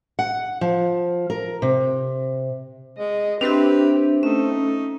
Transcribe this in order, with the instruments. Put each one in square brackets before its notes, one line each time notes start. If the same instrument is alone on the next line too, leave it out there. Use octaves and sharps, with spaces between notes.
[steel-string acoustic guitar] F#5
F3
A#4
C3
[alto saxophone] G#3 [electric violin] D#5
[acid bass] C4 [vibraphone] D4 E5 [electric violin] G4 [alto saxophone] B4
[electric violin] A3 [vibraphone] C#4 [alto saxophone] D#4